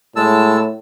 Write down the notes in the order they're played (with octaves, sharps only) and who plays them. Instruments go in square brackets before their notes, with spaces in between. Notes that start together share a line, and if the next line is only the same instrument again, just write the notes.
[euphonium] A2 [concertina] G#3 A5 E6